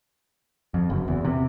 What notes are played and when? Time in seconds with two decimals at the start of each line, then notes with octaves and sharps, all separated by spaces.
0.74 F2
0.90 F#1
1.08 E2
1.25 C3